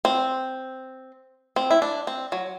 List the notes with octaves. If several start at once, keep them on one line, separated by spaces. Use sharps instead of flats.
C4
C4
E4
D4
C4
F#3